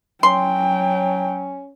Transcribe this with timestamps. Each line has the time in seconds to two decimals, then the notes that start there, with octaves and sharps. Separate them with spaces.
0.23 F#3 C#4 G5 C6